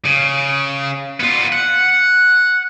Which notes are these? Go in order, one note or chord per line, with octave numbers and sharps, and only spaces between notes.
C#3
B3 F4
F#5